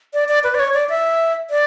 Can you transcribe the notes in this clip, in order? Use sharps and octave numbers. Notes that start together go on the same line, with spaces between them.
D5
D5
B4
D5
C#5
D5
E5
D5